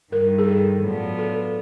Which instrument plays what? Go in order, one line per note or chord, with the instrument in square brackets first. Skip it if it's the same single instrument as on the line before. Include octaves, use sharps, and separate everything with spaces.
[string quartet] G2 D#3 G3 [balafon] A#4
[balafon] G#4
A4
[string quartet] A2 F#3 B3 D4 F4
[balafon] A4